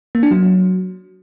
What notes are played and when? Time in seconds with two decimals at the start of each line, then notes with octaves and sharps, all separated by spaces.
0.15 A#3
0.23 D4
0.31 F#3